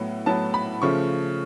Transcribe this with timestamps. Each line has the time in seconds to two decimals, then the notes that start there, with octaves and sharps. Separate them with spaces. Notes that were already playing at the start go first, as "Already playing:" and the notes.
Already playing: A2 F#3 B3
0.26 A2 F#3 B3 A5
0.54 B5
0.82 C#3 F3 A3 C#6